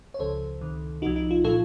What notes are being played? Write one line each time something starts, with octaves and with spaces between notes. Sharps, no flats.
C#5
C#2 C#3 F3 A4 C5
C#2 C3 D#3
C2 C3 F3 D#4 F#4
D#4
F4
A#2 F3 F4 A4